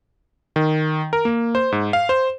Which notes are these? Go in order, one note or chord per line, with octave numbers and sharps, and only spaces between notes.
D#3
A#4
A#3
C5
G#2
F5
C5